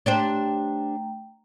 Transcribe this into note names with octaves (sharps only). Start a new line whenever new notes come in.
A3 D4 G4 C5 G5 A#5